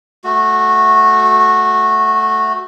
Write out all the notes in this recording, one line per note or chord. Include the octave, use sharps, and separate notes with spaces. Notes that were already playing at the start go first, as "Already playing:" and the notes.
A3 F#4